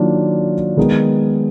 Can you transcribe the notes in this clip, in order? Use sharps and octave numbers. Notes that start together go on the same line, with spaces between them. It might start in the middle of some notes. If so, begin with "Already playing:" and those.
Already playing: D#3 F#3 A#3 D4 F4
D#3 G#3 B3 D#4